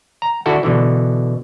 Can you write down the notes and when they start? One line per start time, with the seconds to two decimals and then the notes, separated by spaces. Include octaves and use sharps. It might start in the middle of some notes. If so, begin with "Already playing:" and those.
0.22 A#5
0.46 D3 E4 F#4 A4
0.63 B2 D3 E3